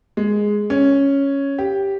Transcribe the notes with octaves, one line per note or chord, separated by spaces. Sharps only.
G#3
C#4
G4